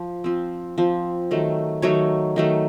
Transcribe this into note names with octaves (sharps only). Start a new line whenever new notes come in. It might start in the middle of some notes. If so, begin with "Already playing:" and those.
Already playing: F3
F3 C4
F3 C4
D#3 F#3 A3
D#3 F#3 A3 C#5
D#3 F#3 A3